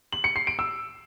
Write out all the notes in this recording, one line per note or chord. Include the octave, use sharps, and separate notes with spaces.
F#7
C#7
C7
D7
E6